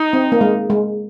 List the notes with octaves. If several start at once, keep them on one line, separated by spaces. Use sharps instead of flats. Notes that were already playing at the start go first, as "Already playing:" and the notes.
Already playing: D#4
C4
A#3
G#3
G#3